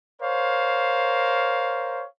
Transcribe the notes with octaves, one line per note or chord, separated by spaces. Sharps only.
A#4 C5 C#5 F5